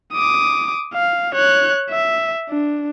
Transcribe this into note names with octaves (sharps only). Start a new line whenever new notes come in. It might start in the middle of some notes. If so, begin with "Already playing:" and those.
D6 D#6
F5
C#5 F#6
E5
D4